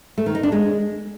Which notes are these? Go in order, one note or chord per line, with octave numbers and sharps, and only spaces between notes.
A3
D#3
D#4
D4
G#3